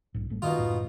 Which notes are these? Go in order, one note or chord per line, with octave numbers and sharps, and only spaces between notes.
B1 G#2
A1 G2 A3
B2 D#3 D#4 F4
C#2 F#2 A2